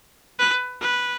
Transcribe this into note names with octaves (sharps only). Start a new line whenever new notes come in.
B4
B4